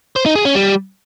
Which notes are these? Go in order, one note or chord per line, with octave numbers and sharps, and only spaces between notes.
C5
D#4
G#4
C#4
G3